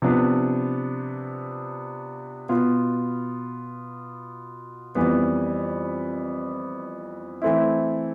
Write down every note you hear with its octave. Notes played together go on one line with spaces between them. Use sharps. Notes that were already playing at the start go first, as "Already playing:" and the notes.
C3 F3 B3 D4
B2 B3 F4
F2 E3 G3 B3
E3 A3 C4 E4